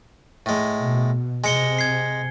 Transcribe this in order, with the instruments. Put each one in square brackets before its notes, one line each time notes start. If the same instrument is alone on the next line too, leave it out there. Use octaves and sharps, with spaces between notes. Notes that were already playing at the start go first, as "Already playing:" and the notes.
[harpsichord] A2 G#3
[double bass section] B2
[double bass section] C3 [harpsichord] G#3 D#5 [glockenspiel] G#5 C#7 G7
[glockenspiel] G#6 C7